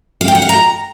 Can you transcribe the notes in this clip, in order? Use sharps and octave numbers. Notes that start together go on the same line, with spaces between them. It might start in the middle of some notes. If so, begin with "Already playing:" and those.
F5
G5
F#5
F5
A#5